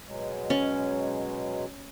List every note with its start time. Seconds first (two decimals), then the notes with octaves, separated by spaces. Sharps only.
0.06 B2 F#3 G#3
0.50 C#4